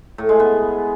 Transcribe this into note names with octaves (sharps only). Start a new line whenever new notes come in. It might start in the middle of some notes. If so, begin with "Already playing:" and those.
A2
G#3
B3